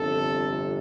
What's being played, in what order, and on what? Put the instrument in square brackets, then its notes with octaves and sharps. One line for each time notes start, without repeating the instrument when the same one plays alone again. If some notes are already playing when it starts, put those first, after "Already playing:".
Already playing: [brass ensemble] G1 F2 C3 A4